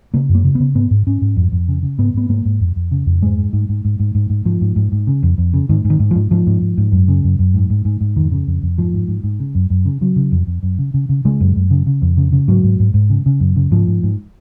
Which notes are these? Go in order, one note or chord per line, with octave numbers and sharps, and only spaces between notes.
C#3 A#3
F#2
A#3
C#3
B3
C#3
G#2 B3
G#2
G#2 C#4
G#2
F2
F2
C#3
C#3
G#2 B3
G#2 B3
G#2 A#3
G#2
F2
F2
C#3
F2
G#2 G#3
G#2
G#2
G#2
G#2
G#2
G#2
G#2
G#2 F3
G#2
G#2
G#2
C#3
F2
F2
C#3
G#2 D#3
G#2
D#3
G#2
F3
G#2
G#2 F3
G#2
G#2
G#2
F#2
C#3
F#2
F#2
G#2
G#2
G#2
G#2
F2 D#3
C#3
F2
F2
G#2 F3
G#2
G#2
G#2
C#3
F#2
F#2
C#3
C#3 F#3
C#3
F2
F2
F#2
C#3
C#3
C#3
C#3 G#3
F#2
F#2
C#3
C#3
F2
C#3
C#3
G#2 F#3
G#2
G#2
G#2
C#3
C#3
F#2
C#3
G#2 F3
G#2
G#2